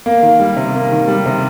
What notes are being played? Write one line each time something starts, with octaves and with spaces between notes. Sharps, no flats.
A#3
D#3
G3
C3
A#3
D#3
G3
C3